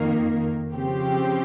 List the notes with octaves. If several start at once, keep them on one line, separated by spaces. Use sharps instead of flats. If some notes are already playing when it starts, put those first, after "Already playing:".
Already playing: F2 D#3 A#3
C#3 F3 C4 G4